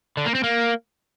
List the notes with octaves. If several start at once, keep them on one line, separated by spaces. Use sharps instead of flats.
D3
A#3
C4
A#3